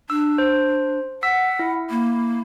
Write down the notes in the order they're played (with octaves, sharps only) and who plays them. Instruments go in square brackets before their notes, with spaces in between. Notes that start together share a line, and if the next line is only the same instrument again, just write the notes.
[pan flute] D4 [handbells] E6
[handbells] C5
[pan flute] F#5 [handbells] E6 B6
[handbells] E4
[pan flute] A#3